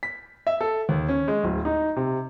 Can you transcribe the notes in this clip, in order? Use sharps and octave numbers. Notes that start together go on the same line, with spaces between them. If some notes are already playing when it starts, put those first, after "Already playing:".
B6
E5
A4
D#2
C#4
G#3
D1
D#4
C3